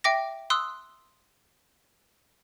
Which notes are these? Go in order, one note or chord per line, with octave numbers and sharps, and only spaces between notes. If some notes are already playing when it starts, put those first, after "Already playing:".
E5 G5 D6 A#6
C6 D#6 E6 F#6